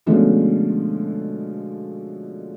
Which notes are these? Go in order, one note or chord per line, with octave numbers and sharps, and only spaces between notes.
B2 D3 F3 G#3 A3 C#4